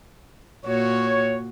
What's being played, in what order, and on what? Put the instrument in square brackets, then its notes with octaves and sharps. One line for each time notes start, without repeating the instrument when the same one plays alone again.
[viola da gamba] A#2 F#4 [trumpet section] C#5